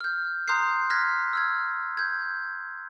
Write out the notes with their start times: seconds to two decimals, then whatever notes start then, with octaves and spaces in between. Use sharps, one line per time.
0.01 F6 G6
0.48 A#5 C6 D#6 F#6 G6 C7
0.90 F6 F#6 G#6 A#6 B6
1.33 E6 F6 G#6
1.97 G6 G#6